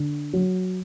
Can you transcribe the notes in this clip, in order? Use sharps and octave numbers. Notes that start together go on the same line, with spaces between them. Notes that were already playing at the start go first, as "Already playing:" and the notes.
Already playing: D3
F#3